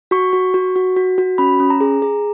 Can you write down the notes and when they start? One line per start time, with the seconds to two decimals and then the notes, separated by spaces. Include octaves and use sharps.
0.11 F#4 C#6
0.33 F#4
0.54 F#4
0.76 F#4
0.96 F#4
1.18 F#4
1.38 C#4 B5
1.60 C#4
1.70 A#5
1.81 G#4
2.02 G#4